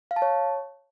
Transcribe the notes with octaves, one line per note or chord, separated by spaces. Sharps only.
F5
A5
C#5